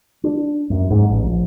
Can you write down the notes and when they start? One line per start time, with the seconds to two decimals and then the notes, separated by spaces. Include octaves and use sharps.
0.24 D4
0.70 F#2
0.90 G#2
1.10 A1
1.24 A#1